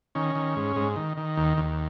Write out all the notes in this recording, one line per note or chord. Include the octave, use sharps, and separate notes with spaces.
D#3 C#4
D#3
G#2
G#2
D#3
D#3
D#2
D#2